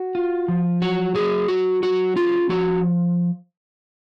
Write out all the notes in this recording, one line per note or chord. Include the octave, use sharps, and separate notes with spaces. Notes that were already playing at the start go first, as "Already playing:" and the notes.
Already playing: F#4
F4
F3
F#3 F#4
F#3 G#4
F#3 F#4
F#3 F#4
C#4 F4
F3 F#4